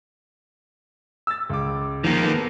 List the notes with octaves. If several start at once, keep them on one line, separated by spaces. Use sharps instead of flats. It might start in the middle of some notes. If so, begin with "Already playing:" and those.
E6 A6
C#2 D6
D#3 F3 A#3
B3 A4